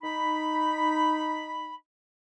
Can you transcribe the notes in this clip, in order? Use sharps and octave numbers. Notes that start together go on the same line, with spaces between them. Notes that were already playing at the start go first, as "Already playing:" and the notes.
D#4 B5